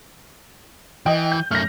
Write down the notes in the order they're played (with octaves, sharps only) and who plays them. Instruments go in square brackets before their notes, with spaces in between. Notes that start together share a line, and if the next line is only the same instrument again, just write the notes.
[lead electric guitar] E3 [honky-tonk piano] D#5 G5
[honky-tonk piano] G6
[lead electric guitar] F#2 A3 [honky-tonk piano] F6 A#6